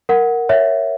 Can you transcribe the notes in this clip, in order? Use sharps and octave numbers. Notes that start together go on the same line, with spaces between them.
A#4 F#5
C#5 E5